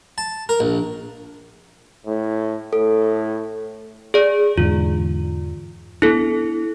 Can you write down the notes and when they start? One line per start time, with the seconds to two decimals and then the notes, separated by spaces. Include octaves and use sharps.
0.18 A5
0.49 A#4
0.60 A#1
2.06 A2
2.73 A2 A4
4.14 G#4 D5
4.58 E2 G#2 D3 F4
6.02 B3 D4 E4 A4